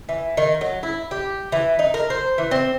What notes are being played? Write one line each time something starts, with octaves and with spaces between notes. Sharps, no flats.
E3
D#3
F#3
E4
G4
E3
D#4
A#4
C5
E3
C4